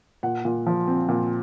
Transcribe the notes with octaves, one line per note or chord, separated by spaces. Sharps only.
A#2 F#5
A#2
F3
C4
A#2